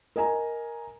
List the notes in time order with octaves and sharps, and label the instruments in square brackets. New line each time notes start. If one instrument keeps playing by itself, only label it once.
[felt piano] A#4 D#5 G#5 A#5